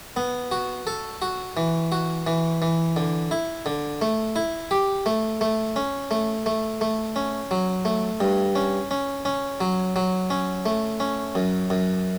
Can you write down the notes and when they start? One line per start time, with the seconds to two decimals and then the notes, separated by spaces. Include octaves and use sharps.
0.16 B3
0.51 F#4
0.87 A4
1.22 F#4
1.57 E3
1.92 F#4
2.27 E3
2.62 E3
2.96 D3
3.31 E4
3.66 D3
4.02 A3
4.36 E4
4.71 G4
5.06 A3
5.41 A3
5.76 C#4
6.11 A3
6.46 A3
6.81 A3
7.16 C#4
7.51 F#3
7.85 A3
8.20 G2
8.55 C#4
8.91 C#4
9.25 C#4
9.61 F#3
9.96 F#3
10.30 C#4
10.66 A3
11.00 C#4
11.35 F#2
11.70 F#2